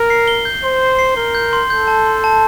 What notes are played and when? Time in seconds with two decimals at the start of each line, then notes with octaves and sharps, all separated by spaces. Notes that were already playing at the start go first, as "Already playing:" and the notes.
Already playing: A#4
0.10 C7
0.28 G7
0.45 G6
0.64 C5 C6
0.81 G7
0.99 C7
1.16 A#4 G7
1.35 G6
1.53 C6
1.70 A4 G6
1.88 A5
2.07 C6
2.24 A5